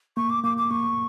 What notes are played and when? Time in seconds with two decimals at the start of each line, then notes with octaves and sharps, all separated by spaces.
0.17 A#3 C#6
0.30 D6
0.44 A#3 D6
0.57 D6
0.71 A#3 C#6